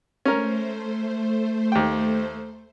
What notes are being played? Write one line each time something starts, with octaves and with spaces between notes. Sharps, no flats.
A3 C#4 A#4 C5
D#2 G5